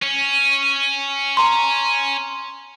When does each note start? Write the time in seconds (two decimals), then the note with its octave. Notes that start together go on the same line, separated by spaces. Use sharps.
0.03 C#4
1.37 A#5 C6